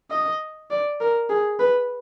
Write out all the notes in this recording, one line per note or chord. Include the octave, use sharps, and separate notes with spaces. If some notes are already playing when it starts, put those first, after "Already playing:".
D#5
D5
A#4
G#4
B4